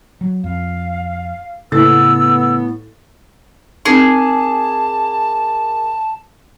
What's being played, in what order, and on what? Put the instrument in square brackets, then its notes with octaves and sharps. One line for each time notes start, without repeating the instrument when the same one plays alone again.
[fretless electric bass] F#3
[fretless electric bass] F2 [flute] F5
[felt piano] A2 A4 A6 [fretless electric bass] C#3 [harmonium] B3 [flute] E6
[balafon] C4 D#4 [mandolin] G#4 [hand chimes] A#4 D6 [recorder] A5